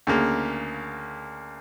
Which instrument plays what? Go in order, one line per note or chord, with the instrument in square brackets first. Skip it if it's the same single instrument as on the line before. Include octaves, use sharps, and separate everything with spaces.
[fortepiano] D2 C#3 A#3